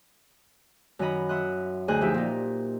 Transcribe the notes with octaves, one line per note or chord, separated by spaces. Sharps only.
F#2 D#3 F#4 D#5 B5
E5 F#5 C6 D#6 F#6
D2 G#4 C5 D#5 F#6
F3 D#4 G4 E5
A#2 D#4